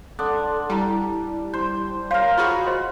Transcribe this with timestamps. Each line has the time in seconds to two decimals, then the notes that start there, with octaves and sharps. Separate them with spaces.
0.19 D4 A4 F#5 C6 D#6
0.70 G3 E4 A5 A#5
1.53 C5
2.11 A#4 C5 C#5 F5
2.38 F4 F#4 G#4 F#5 B5
2.66 C5 D#5 C6